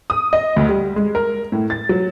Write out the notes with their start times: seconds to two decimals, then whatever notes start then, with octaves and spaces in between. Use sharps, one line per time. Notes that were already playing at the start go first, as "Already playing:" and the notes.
0.10 D#6
0.33 D#5
0.56 D2
0.69 G3
0.96 G#3
1.15 A#4
1.52 A2
1.70 A6
1.89 F#3